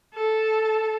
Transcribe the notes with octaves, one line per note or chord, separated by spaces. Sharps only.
A4